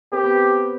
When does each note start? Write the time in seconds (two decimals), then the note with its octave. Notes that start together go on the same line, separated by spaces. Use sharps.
0.12 C4 G4
0.23 B3